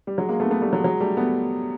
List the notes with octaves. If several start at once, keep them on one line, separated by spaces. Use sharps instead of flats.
G3
F#3 G#3
G#3 A#3
A3 B3
A3 B3
G3 A3
F#3 G#3
F#3 G#3
G3 A3
A3 B3